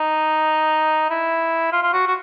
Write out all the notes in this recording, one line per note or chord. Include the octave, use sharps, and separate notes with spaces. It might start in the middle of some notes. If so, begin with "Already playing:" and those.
Already playing: D#4
E4
F4
F4
F#4
F#4